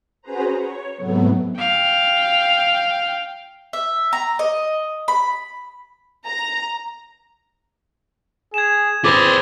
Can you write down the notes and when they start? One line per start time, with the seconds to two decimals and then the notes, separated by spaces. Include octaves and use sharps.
0.22 C#4 F#4 G#4 B4 C5 A#5
0.55 C#5
0.96 G#2 C3 F#3 A3 B3
1.57 F5 G5
3.73 E5
4.13 A#5
4.39 D#5
5.08 B5
6.26 A#5
8.54 G#4 G#6 E7
9.04 C4 G#4 B4 D6 D#6 A6